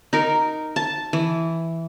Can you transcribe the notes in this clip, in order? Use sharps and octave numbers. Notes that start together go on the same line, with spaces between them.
D#4 A#4
A5
E3